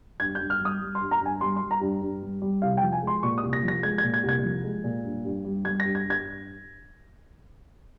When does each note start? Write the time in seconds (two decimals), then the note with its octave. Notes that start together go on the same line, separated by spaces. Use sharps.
0.20 G2 G#6
0.35 G6
0.40 G2
0.50 F6
0.60 G3 D#6
0.81 G3
0.95 C6
1.01 G2
1.11 A#5
1.21 G2
1.26 G#5
1.41 G3 C6
1.56 C6
1.61 G3
1.71 A#5
1.81 G2
2.02 G2
2.22 G3
2.42 G3
2.62 C2 F5
2.77 G5
2.82 F3
2.92 G#5
3.03 G#3 C6
3.23 A#2 C#6
3.38 D#6
3.43 C2
3.53 A#6
3.63 F3
3.68 A#6
3.83 G#3 G#6
3.98 G#6
4.03 A#2
4.14 G#6
4.23 C2
4.29 G#6
4.44 F3
4.64 G#3
4.84 A#2
5.04 G2
5.25 G2
5.45 G3
5.64 G3 G#6
5.80 A#6
5.85 G2
5.95 G#6
6.05 G2
6.10 G#6